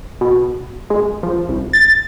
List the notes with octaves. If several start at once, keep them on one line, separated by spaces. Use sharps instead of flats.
B2
G#3
F3
C2
A6